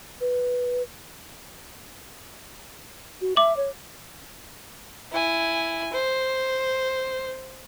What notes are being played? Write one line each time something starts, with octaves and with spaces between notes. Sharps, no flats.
B4
F#4
E5 D6 F#7
C#5
E4 G#5
C5